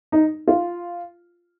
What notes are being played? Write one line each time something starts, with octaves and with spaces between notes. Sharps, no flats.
D#4
F4